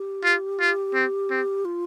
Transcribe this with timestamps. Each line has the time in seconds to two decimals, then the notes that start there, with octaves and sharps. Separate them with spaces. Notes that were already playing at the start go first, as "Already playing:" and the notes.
Already playing: G4
0.24 F4
0.60 F4
0.94 C4
1.30 C4
1.65 F4